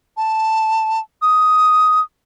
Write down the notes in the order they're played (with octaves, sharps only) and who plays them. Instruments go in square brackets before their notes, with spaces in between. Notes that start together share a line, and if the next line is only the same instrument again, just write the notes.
[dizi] A5
D#6